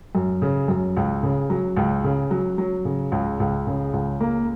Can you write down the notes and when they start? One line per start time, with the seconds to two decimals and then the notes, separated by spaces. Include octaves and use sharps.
0.15 F#2
0.42 C#3
0.68 F#2
0.97 C#2
1.23 C#3
1.50 F#3
1.76 C#2
2.04 C#3
2.31 F#3
2.58 F#3
2.85 C#3
3.12 C#2
3.40 C#2
3.67 C#3
3.93 C#2
4.20 A#3